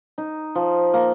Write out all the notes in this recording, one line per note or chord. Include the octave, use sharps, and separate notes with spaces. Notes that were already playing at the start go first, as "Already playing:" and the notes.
D#4
F3
A#3